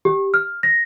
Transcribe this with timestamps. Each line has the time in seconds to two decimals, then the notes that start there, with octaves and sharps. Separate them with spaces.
0.05 G4
0.34 F6
0.63 A#6